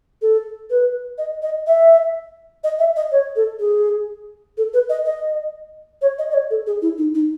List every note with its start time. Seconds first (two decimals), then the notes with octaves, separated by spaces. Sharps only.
0.22 A4
0.70 B4
1.18 D#5
1.42 D#5
1.67 E5
2.64 D#5
2.79 E5
2.96 D#5
3.12 C#5
3.36 A4
3.60 G#4
4.58 A4
4.74 B4
4.89 D#5
5.06 D#5
6.02 C#5
6.19 D#5
6.30 D#5
6.34 C#5
6.51 A4
6.67 G#4
6.82 E4
6.98 D#4
7.15 D#4